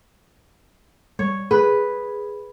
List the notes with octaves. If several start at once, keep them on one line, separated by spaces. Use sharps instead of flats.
G3 C#5
G#4 B4